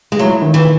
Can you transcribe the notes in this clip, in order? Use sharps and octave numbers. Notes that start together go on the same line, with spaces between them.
G#3
F#3 E4
D#3
E3